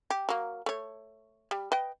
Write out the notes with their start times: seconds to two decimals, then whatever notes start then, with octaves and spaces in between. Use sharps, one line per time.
0.10 G4
0.29 F#3 A#3
0.66 A3 C#5
1.51 G3
1.72 B4 D#5 G5